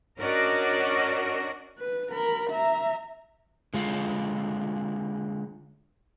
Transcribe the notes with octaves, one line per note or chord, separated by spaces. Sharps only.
C#4 D4 F#4 A#4 D5 D#5
B4
A#4 B5
E5 A#5
D3 G#3 F4 F5